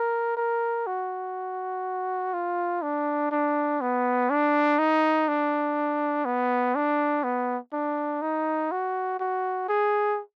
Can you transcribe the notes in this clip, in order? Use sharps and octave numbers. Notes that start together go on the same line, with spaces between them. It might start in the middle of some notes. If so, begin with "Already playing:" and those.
Already playing: A#4
A#4
F#4
F4
D4
D4
B3
D4
D#4
D4
B3
D4
B3
D4
D#4
F#4
F#4
G#4